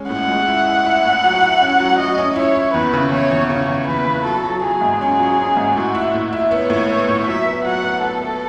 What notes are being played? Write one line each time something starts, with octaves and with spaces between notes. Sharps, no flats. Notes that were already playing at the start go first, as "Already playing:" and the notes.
Already playing: G#3 C#4
A2 F#5
G#3
E4
E4
E4
A2
F#3
E4
C#4
F#3
F#3 D#5
C#4
E4 C#5
E4
E2 B4
C#3
E2 C#5
E2
C#3 C#5
E2
E2 B4
E2
F#3 A4
F#3
F#3 G#4
G#2
C#4 G#4
F#3
C#4
G#2
A2 F#4
E4
A2
E4
B3 C#5
A2
B3
A2
F#3 E5
B3
F#3 F#5
B3
B3 A4
B3